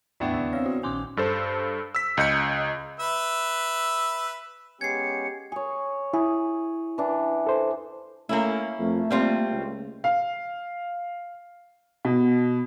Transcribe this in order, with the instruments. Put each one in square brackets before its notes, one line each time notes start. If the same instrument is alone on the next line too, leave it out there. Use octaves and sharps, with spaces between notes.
[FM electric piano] E2 A2 [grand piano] B3 D4 E4 [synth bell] D5 G5 C#6
[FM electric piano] D#2 C#3 E6
[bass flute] C4 [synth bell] C#5 [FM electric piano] F5 E6
[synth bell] F#4
[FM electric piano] A#1 D#3 G6 [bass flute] C#4 [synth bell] G#5 C6 D6
[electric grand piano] G2 A4 C5
E6 B6
C#2 D#5 G6 C#7
[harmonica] B4 E5
[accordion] G#3 B3 C#4 [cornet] G4 [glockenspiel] G#6 C7 [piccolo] C#7
[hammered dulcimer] G#4 C#5
[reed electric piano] E4 [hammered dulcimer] G#4
[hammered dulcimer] E3 D4
[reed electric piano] A4 C5
[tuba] A3 [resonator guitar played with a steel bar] A#3 C#4 E4
[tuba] F2 [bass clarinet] A3
[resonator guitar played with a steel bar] G3 C4 F4 [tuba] A#3
[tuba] C#2
[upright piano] F5
B2